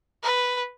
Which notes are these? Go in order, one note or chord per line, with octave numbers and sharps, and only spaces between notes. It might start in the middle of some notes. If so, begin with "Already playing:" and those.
B4